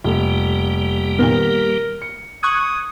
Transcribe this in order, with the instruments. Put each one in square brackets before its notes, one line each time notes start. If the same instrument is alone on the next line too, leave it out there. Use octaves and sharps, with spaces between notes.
[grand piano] F1 [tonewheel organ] G3 A#3 G4
[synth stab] A#2 D#3 B3 [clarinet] A#4
[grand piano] C#7
[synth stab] C#6 F#6 G#6 [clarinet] D#6